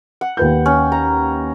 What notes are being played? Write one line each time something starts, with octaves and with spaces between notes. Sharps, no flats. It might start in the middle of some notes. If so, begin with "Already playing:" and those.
F#5
D#2 B4 G6
C#4
A#5